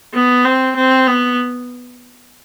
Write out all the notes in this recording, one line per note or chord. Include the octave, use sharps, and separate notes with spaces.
B3
C4
C4
B3